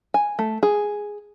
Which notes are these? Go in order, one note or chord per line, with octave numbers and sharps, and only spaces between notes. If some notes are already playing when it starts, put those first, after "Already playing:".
G#5
A3
G#4